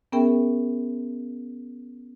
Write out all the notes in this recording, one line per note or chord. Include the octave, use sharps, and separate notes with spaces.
B3 C#4 G#4 A#4 E5 G5